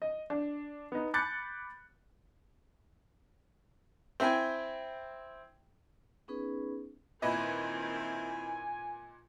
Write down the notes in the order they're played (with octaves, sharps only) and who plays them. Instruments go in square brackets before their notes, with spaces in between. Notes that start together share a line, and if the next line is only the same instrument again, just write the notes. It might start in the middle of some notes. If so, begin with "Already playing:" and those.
[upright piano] D#5
D4
B3 D#4
B5 D6 F#6 G6 A6 C#7
[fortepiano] C4 E4 G5 G#5
[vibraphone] B3 C#4 D#4 G#4 B4
[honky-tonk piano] A#2 B4 D#5 [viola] D#3 C4 [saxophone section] E4 [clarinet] G#5